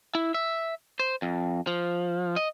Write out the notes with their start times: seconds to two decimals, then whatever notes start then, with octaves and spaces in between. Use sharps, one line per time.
0.15 E4
0.34 E5
1.00 C5
1.22 F2
1.67 F3
2.36 D#5